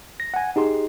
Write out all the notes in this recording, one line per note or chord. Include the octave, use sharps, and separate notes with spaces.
A#6
F#5 G#5
D#4 G4 G#4 C6